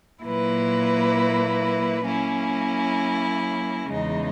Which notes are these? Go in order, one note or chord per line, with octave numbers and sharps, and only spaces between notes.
A#2 F#3 A#3 E4 B4
F#3 A#3 C#4 E4
E2 C#3 G#3 D#4